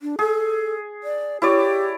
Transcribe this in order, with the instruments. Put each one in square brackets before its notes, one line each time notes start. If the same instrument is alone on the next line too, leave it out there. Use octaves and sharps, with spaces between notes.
[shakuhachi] D4
[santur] G#4 [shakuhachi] A4
[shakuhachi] D5
[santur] E4 C#5 D5 [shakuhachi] G4